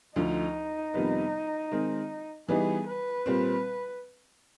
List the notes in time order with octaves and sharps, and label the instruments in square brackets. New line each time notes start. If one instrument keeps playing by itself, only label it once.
[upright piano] D2 D3 F3 [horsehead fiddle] D#4
[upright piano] F2 C3 D#3 G3 B3
D#3 G#3 C4
[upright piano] E3 G3 B3 D#4 [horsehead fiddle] G#4
[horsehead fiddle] B4
[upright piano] A#2 G3 C4